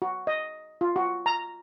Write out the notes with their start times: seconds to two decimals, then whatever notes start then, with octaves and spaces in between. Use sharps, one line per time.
0.02 F#4
0.27 D#5
0.81 F4
0.96 F#4
1.26 A#5